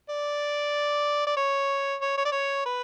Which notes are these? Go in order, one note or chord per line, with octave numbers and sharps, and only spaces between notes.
D5
D5
C#5
C#5
C#5
D5
C#5
B4